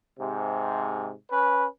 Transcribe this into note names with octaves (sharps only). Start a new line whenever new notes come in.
G#2 C3
C#4 B4